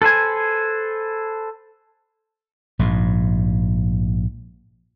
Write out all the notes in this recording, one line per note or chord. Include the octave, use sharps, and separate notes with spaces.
A4 B4 C5 G#5
A#1 G#2